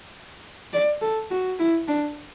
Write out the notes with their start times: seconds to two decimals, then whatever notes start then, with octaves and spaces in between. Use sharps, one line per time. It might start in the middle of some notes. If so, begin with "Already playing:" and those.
0.73 D5
1.02 A4
1.31 F#4
1.59 E4
1.88 D4